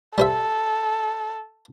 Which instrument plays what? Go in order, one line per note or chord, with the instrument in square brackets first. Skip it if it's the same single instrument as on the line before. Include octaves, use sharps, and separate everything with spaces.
[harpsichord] G3 C5 E5 [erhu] A4